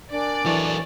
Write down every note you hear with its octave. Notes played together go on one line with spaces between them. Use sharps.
D4 A#4 D5 G#5
E3 F#3 A4 C#6 A6